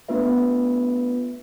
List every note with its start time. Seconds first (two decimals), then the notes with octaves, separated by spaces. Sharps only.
0.08 A3 B3 D4 F4 B4 E5